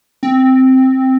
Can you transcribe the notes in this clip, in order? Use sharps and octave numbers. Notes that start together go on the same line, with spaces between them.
C4